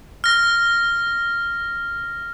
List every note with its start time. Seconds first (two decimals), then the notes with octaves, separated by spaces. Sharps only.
0.24 F6 A#6